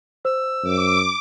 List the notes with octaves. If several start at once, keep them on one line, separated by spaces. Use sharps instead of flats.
C5 E6
F#2 D6